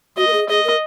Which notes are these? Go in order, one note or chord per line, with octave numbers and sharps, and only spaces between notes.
F#4 D#5
A#4
G#4
G#4 D#5
A#4